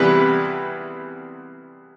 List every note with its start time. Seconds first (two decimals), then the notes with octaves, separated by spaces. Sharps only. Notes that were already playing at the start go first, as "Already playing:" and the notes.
Already playing: E2 C3 E3 G3 B4